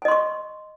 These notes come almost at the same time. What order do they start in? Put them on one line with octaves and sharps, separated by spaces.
G#5 D#5 C6 C#6